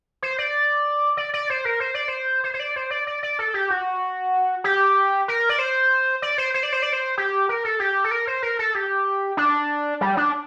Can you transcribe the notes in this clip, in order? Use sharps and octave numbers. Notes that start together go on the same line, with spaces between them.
C5
D5
D5
D5
C5
A#4
C5
D5
C5
C5
C5
D5
C5
D5
D5
D5
A4
G4
F#4
G4
A#4
D5
C5
D5
C5
C5
D5
C5
D5
C5
G4
A#4
A4
G4
A4
A#4
C5
A#4
A4
G4
D4
G3
D4